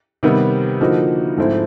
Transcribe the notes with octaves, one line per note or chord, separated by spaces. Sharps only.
C3 D#3 G3 B3
D3 F3 A#3 D#4 F#4
G#2 F3 A3 C4 E4